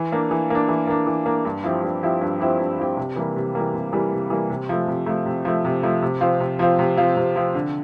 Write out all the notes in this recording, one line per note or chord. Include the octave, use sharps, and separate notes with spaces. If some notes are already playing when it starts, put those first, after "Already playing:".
Already playing: E3
A#3 D4
E3
A#3 D4
E3
A#3 D4
E3
A#3 D4
G2
F3 C4 E4 G4
G2
F3 C4 E4 G4
G2
F3 C4 E4 G4
G2
F3 C4 E4 G4
C3
E3 G3 A#3
C3
E3 G3 A#3
C3
E3 G3 A#3
C3
E3 G3 A#3
C3
F3 A3
C3
F3 A3
C3
F3 A3
C3
F3 A3
C3
F3 C4 F4
C3
F3 C4 F4
C3
F3 C4 F4
C3
F3 C4 F4
D3